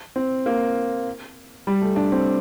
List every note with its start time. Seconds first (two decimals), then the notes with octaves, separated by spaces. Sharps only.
0.16 C4
0.46 A#3
1.67 G3
1.82 A3
1.96 D4
2.12 C4